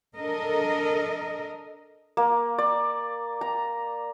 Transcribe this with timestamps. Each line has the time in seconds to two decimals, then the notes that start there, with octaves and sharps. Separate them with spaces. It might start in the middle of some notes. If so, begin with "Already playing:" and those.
0.15 D4 A4 A#4 D#5
2.17 A#3
2.58 D5
3.41 A#5